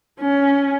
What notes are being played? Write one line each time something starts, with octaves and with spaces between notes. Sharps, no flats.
C#4